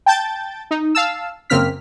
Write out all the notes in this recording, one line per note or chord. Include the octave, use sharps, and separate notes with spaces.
G5 A5 G6 A6
D#4
F5 A5 E6
F#2 C#3 A#3 C4 F6 B6